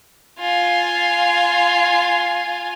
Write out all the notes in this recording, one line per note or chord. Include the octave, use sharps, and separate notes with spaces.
F4 G#5